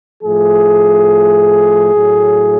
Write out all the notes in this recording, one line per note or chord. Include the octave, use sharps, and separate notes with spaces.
A2 F3 A3 G#4
A2 F#3 A3